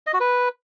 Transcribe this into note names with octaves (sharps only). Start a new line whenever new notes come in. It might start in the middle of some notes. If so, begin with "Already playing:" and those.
D#5
F#4
B4